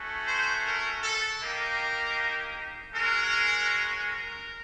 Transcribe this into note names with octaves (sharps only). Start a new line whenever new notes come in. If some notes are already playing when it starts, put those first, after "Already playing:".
Already playing: A3 C#4 F#4
C5
A#4
A4
A#3 D#4 G4 A#4
G#3 C#4 F#4 A#4
A#4